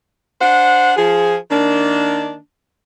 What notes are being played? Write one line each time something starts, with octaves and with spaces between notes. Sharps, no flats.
D4 C5 F#5
F3 G#4
D#3 A#3 D4